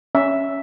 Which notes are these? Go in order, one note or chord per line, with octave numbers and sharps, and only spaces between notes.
C#4 E5